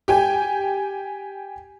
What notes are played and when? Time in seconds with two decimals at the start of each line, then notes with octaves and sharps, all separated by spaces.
0.08 G4 G5 G#5